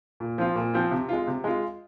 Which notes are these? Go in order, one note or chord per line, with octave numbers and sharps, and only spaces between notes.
A#2
F3 C4 F4
A#2
F3 C4 F4
C3
G#3 F4
C3
G#3 F4